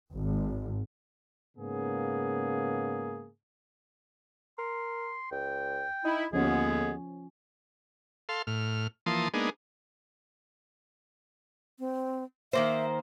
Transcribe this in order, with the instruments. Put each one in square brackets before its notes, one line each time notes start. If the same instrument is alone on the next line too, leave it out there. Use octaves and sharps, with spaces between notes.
[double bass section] G#1
[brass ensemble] G#2 C#3 A#3 B3 G#4
[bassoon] A#4 [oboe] C6
[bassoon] C#2 [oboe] G5
[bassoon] D#4 [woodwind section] E4
[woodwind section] D#2 D3 B3 [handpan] F3 C#4 [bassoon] G#3 [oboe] G#4
[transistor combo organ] A4 F5 C6
A2 F6
E3 F3 A#3 A5 C6 D#6
G#3 A#3 B3 D4 D#4 G#4
[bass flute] C4
[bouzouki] D#3 A#3 C5 [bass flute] E5